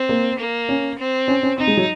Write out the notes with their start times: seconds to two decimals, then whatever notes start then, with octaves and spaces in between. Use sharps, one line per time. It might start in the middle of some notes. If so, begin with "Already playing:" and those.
Already playing: C4
0.09 A#3
0.39 A#3
0.69 C#4
0.98 C4
1.28 C#4
1.43 C#4
1.58 C4 D#4
1.67 G#3
1.77 F#3